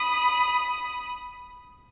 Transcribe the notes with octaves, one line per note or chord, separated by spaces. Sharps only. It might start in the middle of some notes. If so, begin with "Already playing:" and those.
Already playing: B5 D#6